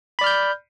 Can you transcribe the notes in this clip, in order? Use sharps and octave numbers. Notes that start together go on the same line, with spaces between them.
D5 B5 F6 G6